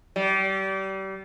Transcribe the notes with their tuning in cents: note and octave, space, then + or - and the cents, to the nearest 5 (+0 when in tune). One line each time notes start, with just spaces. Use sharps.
G3 -30